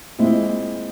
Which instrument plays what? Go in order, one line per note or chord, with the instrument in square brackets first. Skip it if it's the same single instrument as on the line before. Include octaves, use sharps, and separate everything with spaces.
[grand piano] A#2 G#3 C4 E4